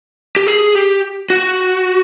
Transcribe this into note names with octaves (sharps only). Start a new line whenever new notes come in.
G4
G#4
G4
F#4